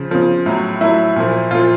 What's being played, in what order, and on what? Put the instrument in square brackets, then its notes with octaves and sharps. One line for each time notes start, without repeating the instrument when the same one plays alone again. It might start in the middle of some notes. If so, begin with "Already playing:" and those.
Already playing: [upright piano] C#3 F3
C#3 F3
A2 F#3
A2 F#3 E4
A#2 F3
A#2 F3 F4